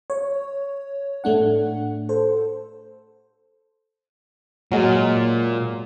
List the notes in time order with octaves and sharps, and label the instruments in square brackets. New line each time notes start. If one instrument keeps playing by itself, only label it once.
[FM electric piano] C#5
A2 A3 D4 F#5
A4 C5
[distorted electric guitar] A#2 [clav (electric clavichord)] F#3 G#3